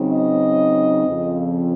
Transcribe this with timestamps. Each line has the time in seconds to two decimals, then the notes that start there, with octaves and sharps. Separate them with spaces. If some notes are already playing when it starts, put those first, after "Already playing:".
Already playing: C#3 F#3 C4 D#4
0.10 D#5
1.05 F2 C#3 F3 C4